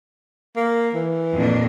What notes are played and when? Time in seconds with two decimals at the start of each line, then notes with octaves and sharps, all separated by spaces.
0.56 A#3
0.94 E3
1.36 F2 A#2 D4